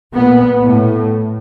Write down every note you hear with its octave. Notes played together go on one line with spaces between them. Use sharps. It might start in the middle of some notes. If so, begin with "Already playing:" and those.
A#2 B3
A2